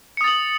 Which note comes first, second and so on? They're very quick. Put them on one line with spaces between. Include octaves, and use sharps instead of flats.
C#7 D#6 A6 F#7